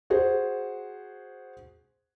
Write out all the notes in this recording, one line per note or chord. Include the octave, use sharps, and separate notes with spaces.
F#4 G#4 C5